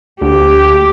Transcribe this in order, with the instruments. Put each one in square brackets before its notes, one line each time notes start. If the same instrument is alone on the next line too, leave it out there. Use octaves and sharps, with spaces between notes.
[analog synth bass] D2 [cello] G4